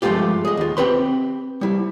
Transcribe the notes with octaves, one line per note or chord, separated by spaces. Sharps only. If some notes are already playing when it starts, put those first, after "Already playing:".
G2 F3 G#3 A3 F4 G4
G#4 D#5
D#2 F4
C4 G4 B4 C6
G3 E4